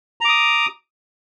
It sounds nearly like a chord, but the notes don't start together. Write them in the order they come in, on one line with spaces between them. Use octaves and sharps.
A#5 D6 D#6